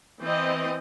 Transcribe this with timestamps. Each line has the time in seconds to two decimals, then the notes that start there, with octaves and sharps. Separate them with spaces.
0.23 E3 C4 D#5